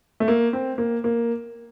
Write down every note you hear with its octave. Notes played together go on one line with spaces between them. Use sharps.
A3
A#3
C4
A#3
A#3